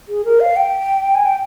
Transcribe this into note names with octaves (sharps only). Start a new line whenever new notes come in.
G#4
A#4
F5
G5
G#5
G5